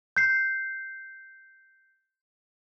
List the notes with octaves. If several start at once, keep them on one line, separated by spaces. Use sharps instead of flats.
G6 C7